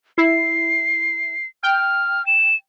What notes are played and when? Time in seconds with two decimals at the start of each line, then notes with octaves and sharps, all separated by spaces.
0.18 E4 C7
1.63 G5 F6
2.27 E7